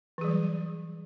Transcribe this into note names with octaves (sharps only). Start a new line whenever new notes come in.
E3 F#3 G3 G#4